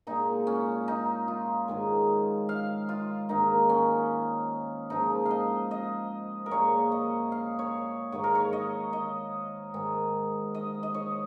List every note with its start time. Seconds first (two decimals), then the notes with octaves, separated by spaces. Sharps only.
0.07 A#2 G#3 D#4
0.47 C#4
0.88 D#4
1.28 F4
1.68 G#2 D#3 G#3
2.49 F5
2.89 F4
3.29 G#2 D#3 A#3 D#4
3.69 C#4
4.90 G#2 F3 A#3 D#4
5.25 F5
5.31 D#5
5.71 D#5
6.46 A#4
6.51 A#2 G#3 C#5
6.92 D#5
7.32 F5
7.59 C#5
8.12 G#2 D#3 A#3 C#5
8.24 A#4
8.35 C#5
8.53 D#5
8.93 D#5
9.74 G#2 D#3 G#3
10.54 D#5
10.83 D#5
10.94 C#5